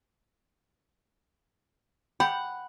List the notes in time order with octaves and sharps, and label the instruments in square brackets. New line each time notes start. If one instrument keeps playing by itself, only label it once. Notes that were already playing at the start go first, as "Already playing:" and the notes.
[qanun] F#5 [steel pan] G5 [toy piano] B5